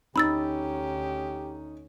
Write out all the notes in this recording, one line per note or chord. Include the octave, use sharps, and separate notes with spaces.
D2 C#4 D#4 G4 B5 E6 A6